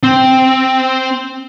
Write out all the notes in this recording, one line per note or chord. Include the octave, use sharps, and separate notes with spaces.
C4